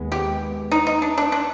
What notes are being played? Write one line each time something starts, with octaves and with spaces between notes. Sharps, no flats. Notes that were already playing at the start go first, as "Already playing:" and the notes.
Already playing: D#2 D#3 G#3 B3
G4
D#4
D#4
D4
D4
D4